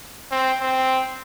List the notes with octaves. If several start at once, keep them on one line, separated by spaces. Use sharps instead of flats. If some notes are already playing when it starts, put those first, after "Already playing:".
C4
C4